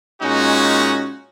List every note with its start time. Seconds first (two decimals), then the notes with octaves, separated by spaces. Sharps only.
0.21 A#2 G#3 C#4 D#4 F#4